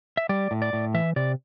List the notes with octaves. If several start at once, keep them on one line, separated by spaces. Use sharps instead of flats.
E5
G3 D5
A2
D5
A2
E3 E5
C3 D5